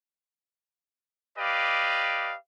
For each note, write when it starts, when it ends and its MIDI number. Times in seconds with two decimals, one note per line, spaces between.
1.37 2.34 67
1.37 2.34 71
1.37 2.34 74
1.37 2.34 75
1.37 2.34 77